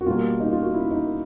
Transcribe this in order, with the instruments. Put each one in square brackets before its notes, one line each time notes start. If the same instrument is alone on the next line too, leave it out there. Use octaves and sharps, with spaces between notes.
[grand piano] F#4
B2 G3 A#3 F4
D#4
F4
F#4
E4
D#4